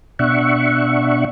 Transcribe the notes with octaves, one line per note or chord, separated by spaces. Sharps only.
B2 D4 E5 F#5 C#6